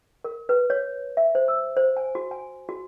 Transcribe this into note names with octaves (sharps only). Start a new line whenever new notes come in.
A#4
B4
C#5
E5
C5
E6
C5
G#5
F#4
G#5
F#4